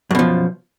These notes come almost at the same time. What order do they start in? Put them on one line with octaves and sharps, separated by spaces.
F#2 B2 F3